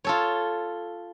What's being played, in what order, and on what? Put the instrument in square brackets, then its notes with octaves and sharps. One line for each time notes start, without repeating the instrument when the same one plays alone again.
[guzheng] F4 A4 C#5